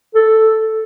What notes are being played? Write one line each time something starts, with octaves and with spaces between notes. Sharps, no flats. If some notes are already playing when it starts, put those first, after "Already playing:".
A4